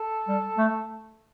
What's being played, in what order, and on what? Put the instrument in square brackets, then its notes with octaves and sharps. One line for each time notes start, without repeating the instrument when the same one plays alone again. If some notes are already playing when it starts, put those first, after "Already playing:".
Already playing: [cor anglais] A4
[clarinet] G3
A3